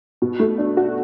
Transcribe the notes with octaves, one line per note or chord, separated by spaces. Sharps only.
B2
A3
D4
F#4